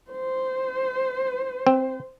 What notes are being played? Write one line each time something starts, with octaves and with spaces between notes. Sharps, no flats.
C5
C4